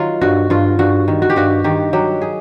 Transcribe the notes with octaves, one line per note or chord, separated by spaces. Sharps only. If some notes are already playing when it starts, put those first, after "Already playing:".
Already playing: D#3 F#3 F4
G2 F#4
G2 F4
G2 F#4
D#3
F#4
G4
G2 F#4
D#3 G4
F#3 G4
G#4